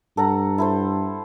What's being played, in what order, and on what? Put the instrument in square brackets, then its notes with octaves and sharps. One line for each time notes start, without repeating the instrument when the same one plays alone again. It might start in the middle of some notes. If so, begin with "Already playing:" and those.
[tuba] G2 [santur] A4 F#5 A#5
[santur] E4 A4 C5